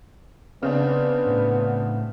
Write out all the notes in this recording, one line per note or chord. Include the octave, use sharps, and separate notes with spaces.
C#3 B3 C4 D4
A2